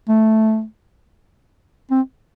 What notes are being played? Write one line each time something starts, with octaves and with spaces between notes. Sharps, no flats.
A3
C4